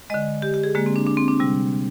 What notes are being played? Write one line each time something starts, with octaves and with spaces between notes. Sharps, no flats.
D3 G#3 D#5
G4
G4
G#4
D3 G#3 A#3
C4
D4
D4
C4
D4
C3 G3